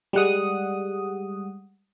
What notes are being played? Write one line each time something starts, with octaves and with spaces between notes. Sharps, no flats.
G3 G#3 F#5 D#6